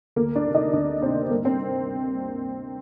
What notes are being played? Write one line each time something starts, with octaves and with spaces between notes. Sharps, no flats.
D2 A#3 A#4
D4 D5
C3 D#3
D#4 D#5
D2 D4 D5
C3 D#3 C4 C5
G2 A#3 A#4
C4 C5